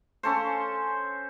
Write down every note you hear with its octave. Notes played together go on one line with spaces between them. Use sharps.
C#4 A4 C5